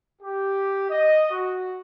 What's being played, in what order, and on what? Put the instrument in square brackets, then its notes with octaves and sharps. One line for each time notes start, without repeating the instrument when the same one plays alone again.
[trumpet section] G4
D#5
F#4